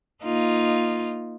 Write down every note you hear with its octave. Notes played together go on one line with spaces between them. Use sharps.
A#3 D#4 F4